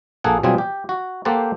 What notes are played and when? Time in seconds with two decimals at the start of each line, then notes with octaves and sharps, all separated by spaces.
0.24 A#1 A#3 G#4 A4 F#5
0.43 B2 F#3 G3 C4 F4 G#4
0.58 G4
0.89 F#4
1.25 A#3 G4 A4 C5 F#5 A5